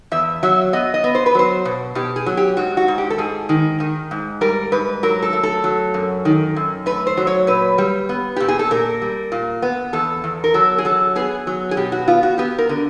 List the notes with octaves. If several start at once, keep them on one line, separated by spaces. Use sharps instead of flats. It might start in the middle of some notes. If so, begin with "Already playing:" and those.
E2 E5
F#3 E5
B3 D#5
D#5
B3
C5
B4
F#3 C5
B2
B2 G4
G#4
F#3
G4
G#2 F#4
F#4
G#2
G4
A4
G#2 G#4
D#3
D#3
G#2
G3 A#4
G#2 B4
F#3 A#4
A4
A3
A4
F#3
F#2
D#3
F#2
A3 B4
C5
F#3
C#5
A#2 B4
G3
B3
A#2 G4
G#4
A4
A#2 A#4
G3
A#2
B3
E2 A4
E2
A#4
F#3 A4
G#4
F#3 A4
B3 G#4
F#3
G#4
B2 G4
F#4
B3 F4
F#4
B3 G4
A#4
D3